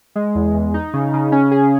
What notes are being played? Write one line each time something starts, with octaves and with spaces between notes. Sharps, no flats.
G#3
E2
E2
D#4
C#3
C#3
C#4
G#4